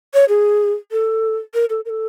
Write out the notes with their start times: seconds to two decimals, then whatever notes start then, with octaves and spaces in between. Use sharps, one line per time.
0.14 C#5
0.29 G#4
0.92 A4
1.54 A#4
1.70 A4
1.85 A#4
1.90 A4